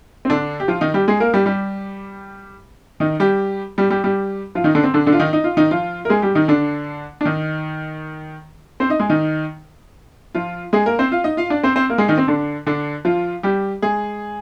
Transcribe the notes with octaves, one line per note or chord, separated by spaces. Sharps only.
C4
D3 D4
G4
F3 F4
D#3 D#4
G3 G4
G#3 G#4
A#3 A#4
G3 G4
G3 G4
D#3 D#4
G3 G4
G3 G4
G3 G4
G3 G4
F3 F4
D#3 D#4
D3 D4
C4
D3 D4
D3 D4
F4
D#3 D#4
D#4
F4
D#3 D#4
F3 F4
A#4
G#3 G#4
G3 G4
D#3 D#4
D3 D4
D4
D#3 D#4
C4 C5
D#4 D#5
G#3 G#4
D#3 D#4
F3 F4
G#3 G#4
A#3 A#4
C4 C5
F4 F5
D#4 D#5
F4 F5
D4 D5
C4 C5
C4 C5
A#3 A#4
G#3 G#4
D#3 D#4
C4
D3 D4
D3 D4
F3 F4
G3 G4
G#3 G#4